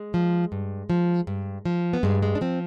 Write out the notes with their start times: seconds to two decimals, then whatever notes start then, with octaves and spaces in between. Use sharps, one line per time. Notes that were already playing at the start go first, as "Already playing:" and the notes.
Already playing: G#3
0.14 F3
0.52 G2
0.90 F3
1.27 G2
1.65 F3
1.93 B3
2.03 G2 G#3
2.23 G#3
2.35 D4
2.41 F3 C4